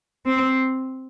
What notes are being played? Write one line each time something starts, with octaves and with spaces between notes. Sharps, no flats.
C4